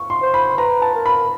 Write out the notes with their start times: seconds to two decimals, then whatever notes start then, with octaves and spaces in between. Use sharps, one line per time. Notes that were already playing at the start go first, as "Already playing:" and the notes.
Already playing: C#6
0.10 C6
0.22 C5
0.34 B5
0.58 B4 A#5
0.82 A5
0.95 A#4
1.06 B5